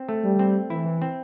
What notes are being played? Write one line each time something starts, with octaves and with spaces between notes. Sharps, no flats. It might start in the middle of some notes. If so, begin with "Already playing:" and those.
Already playing: C4
A3
G3
C4
E3 E4
C4